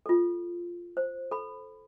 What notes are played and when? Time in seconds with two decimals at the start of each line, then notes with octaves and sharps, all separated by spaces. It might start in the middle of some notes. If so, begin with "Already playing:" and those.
0.06 F4 A4
0.97 C5
1.31 A4 B5